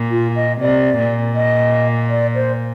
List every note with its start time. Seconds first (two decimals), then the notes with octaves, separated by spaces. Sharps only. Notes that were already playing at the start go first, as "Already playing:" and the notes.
Already playing: A#2
0.11 F4
0.36 D#5
0.61 C3 D5
0.98 A#2
1.35 D#5
2.09 D5
2.35 C5